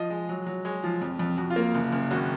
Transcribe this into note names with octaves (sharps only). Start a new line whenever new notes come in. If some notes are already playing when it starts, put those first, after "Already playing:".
Already playing: F3 D#5
G#3
F#3
F#3
G#3 C#5
F3
F2
F2
F2 F#4
F4
A#3
F#1
F#1
G#1 F#4